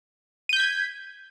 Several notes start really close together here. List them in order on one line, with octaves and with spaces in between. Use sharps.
D#7 G6 B6 G#6